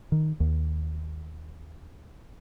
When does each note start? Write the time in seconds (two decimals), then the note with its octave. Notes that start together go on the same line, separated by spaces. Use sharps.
0.12 D#3
0.40 D#2